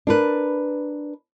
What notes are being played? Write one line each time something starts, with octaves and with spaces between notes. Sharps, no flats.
D4 A#4 B4